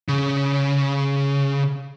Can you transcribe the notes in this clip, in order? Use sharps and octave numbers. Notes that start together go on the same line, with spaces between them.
C#3